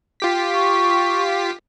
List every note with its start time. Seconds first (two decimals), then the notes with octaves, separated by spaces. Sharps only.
0.20 F4 G4 B6
0.54 C#6